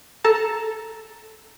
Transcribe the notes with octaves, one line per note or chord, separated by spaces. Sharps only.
A4 A5 A#5